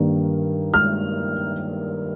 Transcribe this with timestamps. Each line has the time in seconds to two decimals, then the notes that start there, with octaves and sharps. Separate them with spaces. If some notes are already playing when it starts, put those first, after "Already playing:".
Already playing: G2 D#3 A#3 D4
0.74 F6